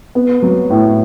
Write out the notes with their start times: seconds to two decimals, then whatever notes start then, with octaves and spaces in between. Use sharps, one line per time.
0.15 B3
0.42 F#3
0.70 A2